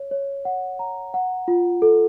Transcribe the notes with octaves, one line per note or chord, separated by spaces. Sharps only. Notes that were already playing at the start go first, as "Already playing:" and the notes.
Already playing: C#5
C#5
F#5
A#5
F#5
F4
A4